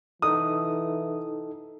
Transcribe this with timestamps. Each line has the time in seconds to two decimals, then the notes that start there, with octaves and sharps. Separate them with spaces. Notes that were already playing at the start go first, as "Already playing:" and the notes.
0.22 E3 D#4 A4 D#6